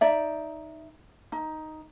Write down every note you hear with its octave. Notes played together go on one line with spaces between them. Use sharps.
D#4 D5 E5
D#4